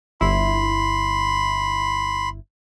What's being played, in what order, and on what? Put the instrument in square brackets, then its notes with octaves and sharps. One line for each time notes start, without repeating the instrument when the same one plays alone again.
[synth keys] G1 E4 [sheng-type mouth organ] B5 C6